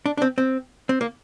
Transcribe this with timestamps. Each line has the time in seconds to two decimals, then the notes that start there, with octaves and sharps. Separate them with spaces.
0.06 D4
0.17 D4
0.22 C4
0.38 C4
0.89 C4
1.01 A#3